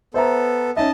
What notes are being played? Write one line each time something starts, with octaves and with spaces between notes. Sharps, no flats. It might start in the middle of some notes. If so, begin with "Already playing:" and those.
B3 A4 C5 E5 A#5
C#4 D#4 D#5 E5 A5